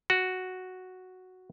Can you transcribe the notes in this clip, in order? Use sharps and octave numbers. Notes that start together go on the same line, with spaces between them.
F#4